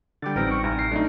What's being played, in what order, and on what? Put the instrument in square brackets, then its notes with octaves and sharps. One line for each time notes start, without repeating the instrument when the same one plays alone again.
[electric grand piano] D3 G3 [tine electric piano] G5 D6 A6
[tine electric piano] A1 D#4 G5 [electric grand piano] G3 C4 B4 [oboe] A#4
[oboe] C#6
[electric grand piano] C2 [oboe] A#4
[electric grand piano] C7
[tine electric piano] F#3 A3 F#4 [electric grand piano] D4 D#4